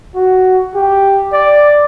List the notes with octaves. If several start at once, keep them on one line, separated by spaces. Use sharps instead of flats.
F#4
G4
D5